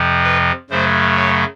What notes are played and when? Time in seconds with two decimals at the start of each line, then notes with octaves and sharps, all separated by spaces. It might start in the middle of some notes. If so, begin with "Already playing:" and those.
Already playing: F2 C3 F3
0.23 B4
0.70 F#2 C#3 F#3 A3 C5
1.16 C#5